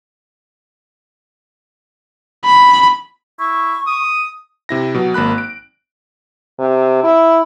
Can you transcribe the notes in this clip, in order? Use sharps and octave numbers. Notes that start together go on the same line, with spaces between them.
B5
E4 C#6
D#6
C3 E4 A#6
B2 F#3
G#1 A#3 B5 F#6
D7
C3
E4